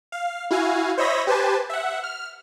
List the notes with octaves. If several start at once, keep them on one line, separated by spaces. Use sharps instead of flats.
F5
E4 F#4 F5 G#5
C5 C#5 D#5 E5 B5 A#6
G4 B4 C5 G#5 A5
E5 F#5
F6